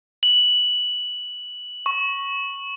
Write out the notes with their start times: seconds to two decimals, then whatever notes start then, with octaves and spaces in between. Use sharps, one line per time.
0.23 F#7
1.86 C#6